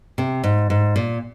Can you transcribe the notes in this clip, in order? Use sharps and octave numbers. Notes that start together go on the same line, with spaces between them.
C3
G#2
G#2
A#2